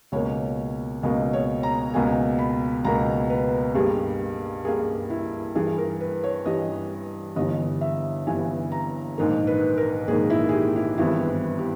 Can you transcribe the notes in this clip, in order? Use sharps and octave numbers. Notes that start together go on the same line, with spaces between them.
C#2 B2 A#3 C#5
C#2 B2 A#3 D#5
C#5
A#5
C#2 B2 A#3 G#5
B5
C#2 B2 A#3 A#5
B4
G2 G3 A#3 G#4
G2 G3 A#3 G#4
E4
G2 E3 G3 G#4
A#4
B4
C#5
G2 E3 G3 D#5
G1 G2 E3 D#5
E5
G1 G2 E3 G#5
A#5
A#1 G#2 D#3 A#3
B4
A#4
A#1 G#2 D#3 A#3 G#4
E4
G#4
G4
E4
G#1 G2 E3 G3 B3 E4
E4
G4